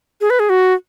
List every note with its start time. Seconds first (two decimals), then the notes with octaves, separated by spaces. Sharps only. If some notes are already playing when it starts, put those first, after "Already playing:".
0.21 G#4
0.30 B4
0.40 G#4
0.50 F#4